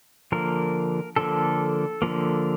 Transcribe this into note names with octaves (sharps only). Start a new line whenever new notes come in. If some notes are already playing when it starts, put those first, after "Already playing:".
D3 F3 A#3 A#4
D3 F3 A#3 A4
D3 F3 A#3